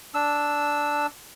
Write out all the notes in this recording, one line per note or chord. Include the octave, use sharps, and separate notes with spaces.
D4 E6